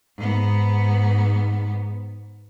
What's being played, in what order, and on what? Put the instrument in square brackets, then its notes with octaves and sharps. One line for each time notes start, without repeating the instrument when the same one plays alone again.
[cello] G#2 B3